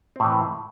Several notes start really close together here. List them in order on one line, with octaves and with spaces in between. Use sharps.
C4 A2 E3